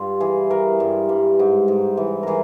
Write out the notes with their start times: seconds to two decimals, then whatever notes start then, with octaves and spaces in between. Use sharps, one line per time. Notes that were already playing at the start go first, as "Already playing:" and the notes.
Already playing: G2 F4
0.20 E3 G#4
0.50 E3 A#4
0.80 G2
1.09 G2
1.39 G#2
1.68 G#2
1.97 E3
2.23 E3 G#4 A#4